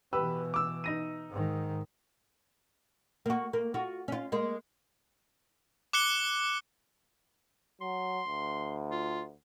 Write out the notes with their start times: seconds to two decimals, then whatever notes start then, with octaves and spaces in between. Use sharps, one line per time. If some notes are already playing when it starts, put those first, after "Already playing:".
0.13 B2 E3 G4 B4 E6
0.54 D6 E6
0.84 D#4 A#6 D#7
1.30 G#2 D#3
3.26 A#3 F#4
3.53 A#3
3.74 F4 F#4
4.08 C#4 F4
4.32 G#3 A#3
5.93 D6 F#6 C#7 G7
7.81 F#3 C6
8.27 D2
8.91 F4